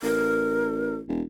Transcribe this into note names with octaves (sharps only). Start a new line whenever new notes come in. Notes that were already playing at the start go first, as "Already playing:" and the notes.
A1 A#4
E1